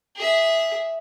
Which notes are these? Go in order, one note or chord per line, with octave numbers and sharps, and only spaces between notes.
G#4 E5